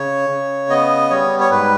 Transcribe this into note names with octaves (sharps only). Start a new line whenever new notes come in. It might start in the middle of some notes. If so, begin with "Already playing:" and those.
Already playing: C#3 C#5
C#3
B3 D#5
G3 C#5
C#5
G#2 B4